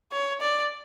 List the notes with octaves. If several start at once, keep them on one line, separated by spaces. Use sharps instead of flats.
C#5
D5